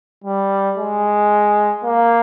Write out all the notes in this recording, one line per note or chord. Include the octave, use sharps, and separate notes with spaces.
G3
G#3
A#3